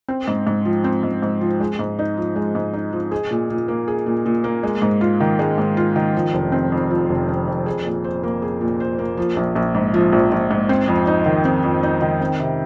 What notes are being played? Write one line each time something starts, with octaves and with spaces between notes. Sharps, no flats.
C4
G#2
G#2
F3
C4
G#2
G#2
F3
G#3
G#2
D#4
F3
G#3
G#2
D#4
F3
G#4
A#2
A#2
A#3
G#4
A#2
A#2
A#3
G#3
G#2
F4
D#3
G#3
G#2
F4
D#3
F3
F1
C4
F2
F3
F1
C4
F2
G#4
A#2
C5
A#3
G#4
A#2
C5
A#3
F3
A#1
A#1
G#2
F3
A#1
A#1
G#2
C4
F2
D#4
D#3
C4
F2
D#4
D#3
C4
C3